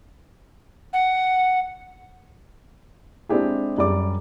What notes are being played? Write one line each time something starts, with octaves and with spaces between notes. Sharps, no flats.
F#5
G#3 C4 D4 E4 G4 G#4
F#2 G3 G#4 D5 D6